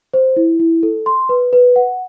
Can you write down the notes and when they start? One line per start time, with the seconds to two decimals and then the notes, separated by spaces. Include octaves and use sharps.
0.14 C5
0.37 E4
0.59 E4
0.83 A4
1.06 C6
1.29 B4
1.53 B4
1.76 F#5